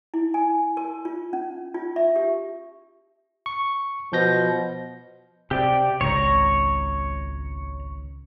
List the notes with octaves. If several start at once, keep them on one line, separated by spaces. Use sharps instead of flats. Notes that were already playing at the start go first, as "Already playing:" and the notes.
E4
G#5
A#4
F4
C#4
F4
E5
G4
C#6
B2 F3 G6 A#6
C3 G4 D5
G#1 C#2 C#5 A#5